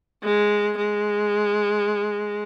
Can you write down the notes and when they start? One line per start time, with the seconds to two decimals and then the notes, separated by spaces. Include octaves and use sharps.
0.24 G#3
0.77 G#3